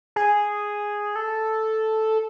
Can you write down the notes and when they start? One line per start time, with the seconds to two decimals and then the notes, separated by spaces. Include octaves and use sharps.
0.16 G#4
1.16 A4